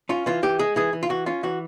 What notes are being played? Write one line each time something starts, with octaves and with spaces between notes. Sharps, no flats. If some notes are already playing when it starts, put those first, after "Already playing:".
C#4 F4
E3 F4
E3 G4
G#3 G#4
E3 G#4
E3
F4
E3 F#4
C#4 F4
E3 F#4